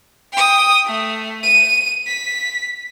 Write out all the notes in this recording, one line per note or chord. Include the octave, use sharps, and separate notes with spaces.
G5 D#6
A3
D#7
B6